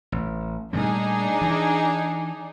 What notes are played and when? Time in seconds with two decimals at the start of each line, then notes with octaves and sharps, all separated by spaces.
0.12 A1
0.73 A#2 G3 A3 D4 D#4 G#4
1.42 E3